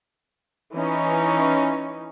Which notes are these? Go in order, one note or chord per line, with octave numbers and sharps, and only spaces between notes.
E3 C#4 D#4